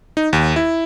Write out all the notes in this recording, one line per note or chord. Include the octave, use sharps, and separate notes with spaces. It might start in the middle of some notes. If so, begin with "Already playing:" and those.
D#4
D#2
E4